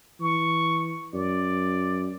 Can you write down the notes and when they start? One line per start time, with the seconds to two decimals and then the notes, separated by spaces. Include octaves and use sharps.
0.20 E3 C#6
1.14 F#2 D5